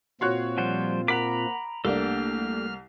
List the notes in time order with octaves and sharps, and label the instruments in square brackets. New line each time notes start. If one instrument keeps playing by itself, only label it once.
[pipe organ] A#2 C4 F4 [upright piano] F#4 C#5 F#6 [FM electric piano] C6
[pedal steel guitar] F3 G3 C5 [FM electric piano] F#5
[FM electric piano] A#4 F#5 [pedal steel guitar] A#5 B5 D6 [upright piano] B6
[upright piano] C2 [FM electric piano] A3 A#3 D4 [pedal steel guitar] G4 A4 [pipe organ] F6